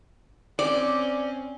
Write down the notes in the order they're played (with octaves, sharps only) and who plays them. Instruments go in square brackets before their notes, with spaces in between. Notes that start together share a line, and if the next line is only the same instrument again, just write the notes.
[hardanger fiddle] C4 C#4 [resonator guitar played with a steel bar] D5